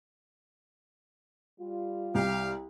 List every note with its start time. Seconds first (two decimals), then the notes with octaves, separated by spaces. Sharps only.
1.59 G3 F4
2.14 C2 G4 F5